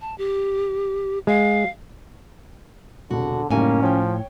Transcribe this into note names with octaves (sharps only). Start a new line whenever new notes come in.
A5
G4
G#3 F5
E1 C2 D3 F#4
F#1 A2 G3 A#3 C#4 D#4 G#5
F3 C#5 G5